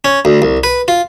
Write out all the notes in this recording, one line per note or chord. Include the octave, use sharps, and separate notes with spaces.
C#4
D2
C2
B4
F4